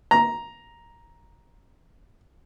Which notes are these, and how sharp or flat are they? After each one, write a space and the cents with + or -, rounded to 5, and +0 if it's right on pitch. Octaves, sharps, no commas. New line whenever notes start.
A#5 +5